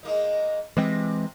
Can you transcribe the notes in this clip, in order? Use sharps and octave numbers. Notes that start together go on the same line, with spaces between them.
G#3 A#3 D#4
C3 E3 G#3 C4